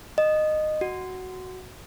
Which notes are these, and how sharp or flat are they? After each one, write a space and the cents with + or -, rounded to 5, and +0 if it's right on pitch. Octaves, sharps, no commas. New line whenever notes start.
D#5 -15
F#4 +0